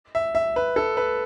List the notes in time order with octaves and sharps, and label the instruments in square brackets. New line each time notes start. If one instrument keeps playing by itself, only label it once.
[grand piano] E5
E5
B4
A4
B4